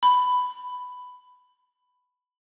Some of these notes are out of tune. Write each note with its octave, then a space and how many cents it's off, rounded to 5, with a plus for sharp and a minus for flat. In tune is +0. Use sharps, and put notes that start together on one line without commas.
B5 +10